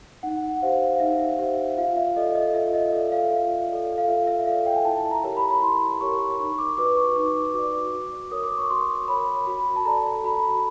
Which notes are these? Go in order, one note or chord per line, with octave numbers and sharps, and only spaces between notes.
D#4 F#5
G4 C5 F5
F5
D#4 E5
G4 C5 E5
F4 F5
E5
A4 D5 D#5
D#5
F4 E5
D#5
A4 D5 E5
F5
F4
A4 D5
F5
F4 E5
E5
A4 D5 F5
G5
G#5
E4 A5
A#5
G4 A#4 C#5
B5
A#5
B5
E4 C6
G4 A#4 C#5 C#6
D#4 C#6
D6
F#4 B4 D5 D6
C#6
D#4 D6
F#4 B4 D5 D6
F#4
A#4 C#5 D#6
D6
C#6
F#4 C6
A#4 C#5 B5
F#4 B5
A5
A4 D5 A#5
F#4 B5